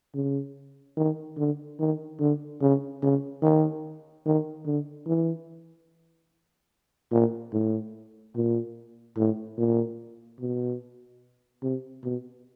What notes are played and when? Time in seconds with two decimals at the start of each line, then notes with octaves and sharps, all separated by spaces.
0.14 C#3
0.97 D#3
1.37 D3
1.79 D#3
2.19 D3
2.61 C#3
3.02 C#3
3.42 D#3
4.25 D#3
4.66 D3
5.07 E3
7.12 A#2
7.53 A2
8.35 A#2
9.17 A2
9.57 A#2
10.40 B2
11.62 C3
12.03 B2